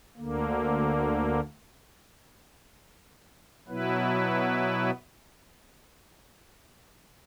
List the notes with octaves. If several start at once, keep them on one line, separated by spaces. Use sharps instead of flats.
D2 D3 A#3
B2 F#3 B3 E4 B4